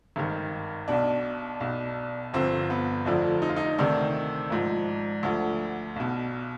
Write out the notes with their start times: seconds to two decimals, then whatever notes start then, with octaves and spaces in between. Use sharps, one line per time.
0.16 G#1 G2 D#3
0.88 B1 B2 D4
1.61 B1 B2
2.34 G1 G2 D3 F3 C4
2.70 B3
3.05 F1 F2 D3 F3 D4
3.42 D#4
3.49 F4
3.56 D#4
3.78 D2 C3 D#3 D4
4.50 G#1 G#2 F3
5.23 D2 D3 F3
5.96 B1 B2